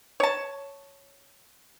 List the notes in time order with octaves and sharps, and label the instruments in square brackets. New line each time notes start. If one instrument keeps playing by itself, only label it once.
[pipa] C#5 A5